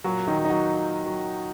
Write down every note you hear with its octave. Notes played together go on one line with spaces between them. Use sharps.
A#2 F#3 F#4
D#3 D#4
F#3
D#4
F#3 F#4
A#2
F#3